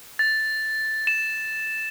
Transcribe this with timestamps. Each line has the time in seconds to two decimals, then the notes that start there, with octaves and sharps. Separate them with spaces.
0.19 A6
1.07 E7